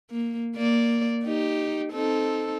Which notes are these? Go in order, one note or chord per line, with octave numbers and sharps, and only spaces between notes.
A#3
A#3 D5
D#4 G4
C4 D#4 A4